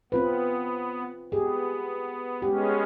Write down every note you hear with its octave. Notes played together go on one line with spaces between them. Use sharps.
B3 C4 F4 B4
B3 G4 G#4
G#3 B3 C#4 G4